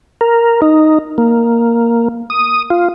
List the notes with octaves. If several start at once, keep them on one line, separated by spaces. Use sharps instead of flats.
A#4
D#4
A#3
D#6
F4